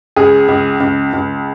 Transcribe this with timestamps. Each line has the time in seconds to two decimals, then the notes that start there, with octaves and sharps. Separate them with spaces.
0.16 C#2 G#4
0.48 C#2
0.80 C#2
1.13 C#2